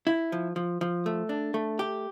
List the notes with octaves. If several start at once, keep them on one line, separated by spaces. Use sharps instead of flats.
E4
F3
F3
F3
A3
D4
A3
G4